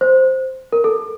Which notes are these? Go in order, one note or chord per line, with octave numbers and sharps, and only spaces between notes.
C5
A#4
A4